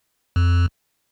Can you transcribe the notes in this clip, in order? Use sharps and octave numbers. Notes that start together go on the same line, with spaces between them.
F2